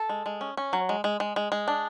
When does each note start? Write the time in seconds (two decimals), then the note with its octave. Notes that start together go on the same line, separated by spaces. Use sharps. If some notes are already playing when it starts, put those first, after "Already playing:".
Already playing: A4
0.09 G#3
0.26 G#3
0.41 C#4
0.57 C#4
0.73 F#3
0.89 G#3
1.04 G#3
1.20 G#3
1.36 G#3
1.52 G#3
1.68 D4